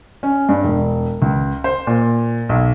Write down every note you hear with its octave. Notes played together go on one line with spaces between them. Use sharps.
C#4
G2
E1
C#2
C5
A#2
B1